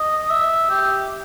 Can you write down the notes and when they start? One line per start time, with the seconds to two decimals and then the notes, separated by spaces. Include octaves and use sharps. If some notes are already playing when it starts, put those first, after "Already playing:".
Already playing: D#5
0.30 E5
0.70 G4